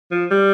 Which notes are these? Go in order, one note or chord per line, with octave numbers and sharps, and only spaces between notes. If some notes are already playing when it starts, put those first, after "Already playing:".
F3
G3